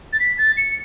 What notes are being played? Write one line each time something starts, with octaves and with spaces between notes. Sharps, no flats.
A6
B6
A6
C#7